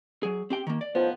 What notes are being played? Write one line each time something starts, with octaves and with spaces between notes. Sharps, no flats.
F#3 G#4
C4 G4 G5
D#3 A#3
D5
A2 D#3 F3 B3